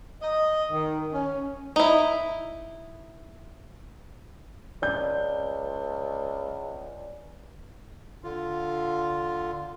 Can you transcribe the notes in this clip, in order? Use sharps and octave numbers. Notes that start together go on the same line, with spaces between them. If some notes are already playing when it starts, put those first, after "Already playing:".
D#5
D#3
C#4
D#4 E4
C#2 D5 G6
D3 F4